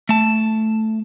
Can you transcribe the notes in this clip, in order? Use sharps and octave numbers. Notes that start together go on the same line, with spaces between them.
A3 A5